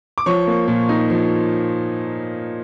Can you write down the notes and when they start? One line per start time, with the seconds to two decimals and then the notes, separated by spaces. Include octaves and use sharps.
0.18 D6
0.26 F3 C#5 C#6
0.47 A#3
0.67 A#2
0.89 D#4
1.10 F3